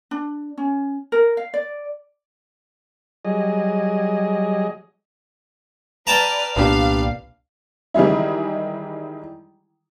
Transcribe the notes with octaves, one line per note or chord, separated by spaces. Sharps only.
D4
C#4
A#4
F5
D5
F#3 G3 G#4 D#5
B4 D5 G5 A5 A#5 F6
C2 A#2 B3 D4 G4 F5
D#3 E3 G3 G#3 E4